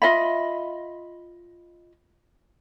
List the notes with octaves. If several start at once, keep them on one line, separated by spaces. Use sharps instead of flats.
F4 D#5 E5 B5